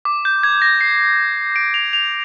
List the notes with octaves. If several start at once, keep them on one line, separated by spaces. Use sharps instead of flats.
D6
G6
G#6
A#6
C7
D7
F7
F7